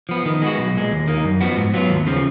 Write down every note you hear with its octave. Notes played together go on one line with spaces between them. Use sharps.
F3 B3
D#3
G#3 B3 F#4
B1
A#2 G#3
D#2
D#3 A#3
F#2
F3 B3 F#4
G#2
F#3 B3 F4
D#2
C#3 F3